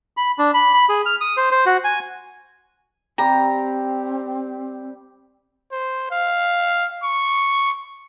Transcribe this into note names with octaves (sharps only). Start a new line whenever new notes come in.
B5
D4
B5
B5
G#4
F6
D#6
C5
C5
F#4
G#5
G3 C4 G4 A#5
C5
F5
C#6